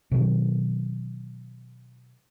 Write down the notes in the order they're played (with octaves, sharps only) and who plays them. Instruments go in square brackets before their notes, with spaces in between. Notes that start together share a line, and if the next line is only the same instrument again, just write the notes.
[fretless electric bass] B2 D#3 F#3 C4